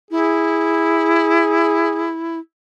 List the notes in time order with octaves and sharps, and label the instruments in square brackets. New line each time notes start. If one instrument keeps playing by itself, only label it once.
[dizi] E4 [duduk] G#4